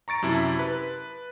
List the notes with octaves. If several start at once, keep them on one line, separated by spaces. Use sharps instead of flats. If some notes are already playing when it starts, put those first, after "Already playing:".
A#5 C#6 A6 D7
F#2 C3 E4 A5
B4